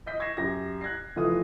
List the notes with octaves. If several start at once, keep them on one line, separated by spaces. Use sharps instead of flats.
D#5 G6 B6
C#6 G#6 A#6 C7 E7
F#2 G4 A#6
F#6 G#6 A#6 C7
F1 E3 A3 F4 D#6